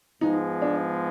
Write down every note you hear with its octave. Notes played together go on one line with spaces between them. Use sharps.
G#2 F3 G#3 B3 D#4
D4